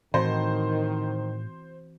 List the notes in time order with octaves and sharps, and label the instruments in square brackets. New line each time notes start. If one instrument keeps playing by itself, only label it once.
[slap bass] A2 [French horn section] D#3 [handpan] E3 C4 F#4 [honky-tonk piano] C5